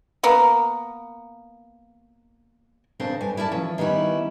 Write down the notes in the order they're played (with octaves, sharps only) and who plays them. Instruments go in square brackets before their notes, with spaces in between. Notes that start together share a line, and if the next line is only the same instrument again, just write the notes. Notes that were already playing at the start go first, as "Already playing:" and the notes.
[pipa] A#3 B3
[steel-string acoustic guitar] E2 C#3 C4 D4 A4 A#4
G2 G#5
E4 A#4 D5 A5
E3 F3 C#4
D#3 G3 B3 C#4 E4